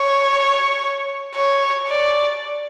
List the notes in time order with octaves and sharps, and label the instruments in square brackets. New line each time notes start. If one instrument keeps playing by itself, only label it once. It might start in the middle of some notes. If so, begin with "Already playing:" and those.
Already playing: [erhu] C#5
C#5
D5